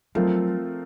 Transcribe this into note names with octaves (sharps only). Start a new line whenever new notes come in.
F3 F#3 A3 C4 F4 A#4